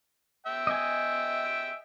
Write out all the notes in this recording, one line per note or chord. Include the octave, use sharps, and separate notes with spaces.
E5 G5
D#5 G#5